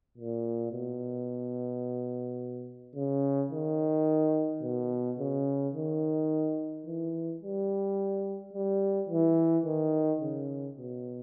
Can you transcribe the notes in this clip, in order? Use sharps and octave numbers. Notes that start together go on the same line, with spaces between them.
A#2
B2
C#3
D#3
B2
C#3
D#3
E3
G3
G3
E3
D#3
C#3
B2